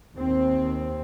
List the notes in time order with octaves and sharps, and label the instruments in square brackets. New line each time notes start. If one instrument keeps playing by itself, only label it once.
[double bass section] D#2 C4